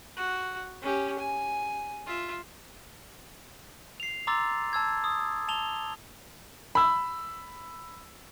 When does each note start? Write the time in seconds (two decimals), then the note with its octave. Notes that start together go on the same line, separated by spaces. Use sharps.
0.17 F#4
0.82 C#4 G4
1.19 G#5
2.07 F4 E5
4.00 C7 F7
4.27 A#5 C6 D6 E6 A6
4.73 A5 E6 G#6
5.04 D#6
5.48 A5 F7 G7
6.75 B5 E6